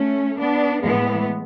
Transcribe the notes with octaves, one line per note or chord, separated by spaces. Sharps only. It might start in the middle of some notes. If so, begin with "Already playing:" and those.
Already playing: A3 C#4
B3 D4
A2 E3 G#3 B3